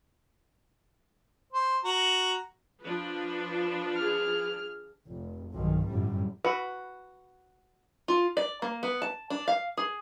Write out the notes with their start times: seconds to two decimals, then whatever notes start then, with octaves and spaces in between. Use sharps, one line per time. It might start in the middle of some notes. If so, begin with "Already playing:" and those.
1.52 C5
1.84 F#4 A#5
2.83 F3 D4 B4
3.96 G#4 F6
5.08 F1
5.54 B1 G2 D#3
5.87 G1 F#2 A2 G3
6.45 F#4 B4
8.08 F4
8.37 D5
8.62 A#3
8.83 B3
9.02 A5
9.30 D4
9.48 F5
9.77 G#4